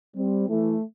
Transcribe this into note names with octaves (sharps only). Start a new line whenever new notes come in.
G3 C4
E3 A3